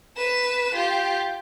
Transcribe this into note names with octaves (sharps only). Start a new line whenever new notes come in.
B4 E7
F4 G4